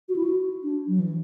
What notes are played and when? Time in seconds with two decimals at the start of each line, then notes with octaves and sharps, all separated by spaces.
0.09 F#4
0.16 E4
0.23 F#4
0.63 D4
0.88 F#3
0.99 E3